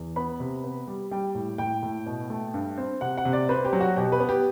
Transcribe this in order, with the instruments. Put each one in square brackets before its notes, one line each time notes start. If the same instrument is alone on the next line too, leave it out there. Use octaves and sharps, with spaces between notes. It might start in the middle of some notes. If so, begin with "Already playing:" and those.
Already playing: [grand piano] E2
B3 B5
C3
B3
G3
G3 G5
A2
A2 G5
A2
B2
A3
G2
C4
C3 F#5
F#5
C3
D5
C4 B4
G4
F#3
F#4
B2 G4
B4
B3
G4